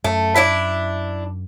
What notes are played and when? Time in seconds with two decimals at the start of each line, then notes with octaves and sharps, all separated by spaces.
0.04 F#2 A3
0.36 D4 E4 E5